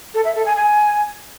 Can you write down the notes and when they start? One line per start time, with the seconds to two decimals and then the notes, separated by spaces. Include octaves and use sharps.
0.14 A4
0.25 E5
0.35 A4
0.46 G#5
0.56 G#5